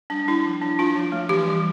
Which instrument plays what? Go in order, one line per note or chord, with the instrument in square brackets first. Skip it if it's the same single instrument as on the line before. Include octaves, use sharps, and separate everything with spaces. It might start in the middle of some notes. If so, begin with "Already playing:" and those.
[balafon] G3 D4
D4 E4
F3
D4
D4 F4
F3
A3
E3 G4
G3